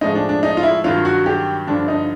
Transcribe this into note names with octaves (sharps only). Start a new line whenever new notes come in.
A2 F3 G#3 D#4
D4
D4
D#4
F4
E4
G2 D#3 F#3 F4
F#4
G4
G2 D3 F3 D4
D#4